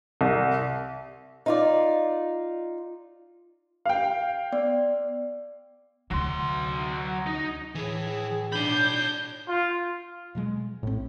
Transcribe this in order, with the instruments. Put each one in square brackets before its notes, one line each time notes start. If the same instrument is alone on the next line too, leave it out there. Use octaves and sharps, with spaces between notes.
[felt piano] C2
[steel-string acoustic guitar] D#4 F4 D5
[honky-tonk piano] F5 G5
[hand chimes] B3 D5
[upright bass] D2 C3 [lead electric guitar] F#3 C6
[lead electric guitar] D#4
[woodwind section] A2 [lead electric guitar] E3 [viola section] G#4
[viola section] D4 [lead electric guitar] C#5 B5 [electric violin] G6
[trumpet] F4
[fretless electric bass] B2 F#3 G#3
[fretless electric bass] A#1 C4 [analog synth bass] A2